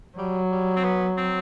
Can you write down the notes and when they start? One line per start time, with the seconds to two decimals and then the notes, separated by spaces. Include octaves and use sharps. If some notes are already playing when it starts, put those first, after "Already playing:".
0.17 F#3 G3
0.51 G3
0.76 C4
0.84 B3
1.18 C4